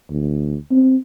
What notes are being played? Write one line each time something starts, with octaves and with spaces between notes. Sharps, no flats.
D2
C4